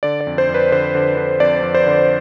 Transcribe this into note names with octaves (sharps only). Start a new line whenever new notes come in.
D3 D5
D5
F2
C5
F2
B4
D3 C5
D3
D3
F2 D5
F2
C5
D3